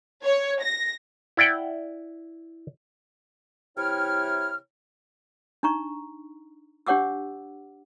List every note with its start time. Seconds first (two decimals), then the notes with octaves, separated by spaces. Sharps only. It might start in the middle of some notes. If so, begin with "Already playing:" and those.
0.23 C#5
0.62 A#6
1.37 E4 D5 F#5 G5
3.77 C3 E3 E4 C#5 G5 F6
5.63 D4 D#4 A#5 C#6
6.87 D4 G4 C#5 F#5 D6 E6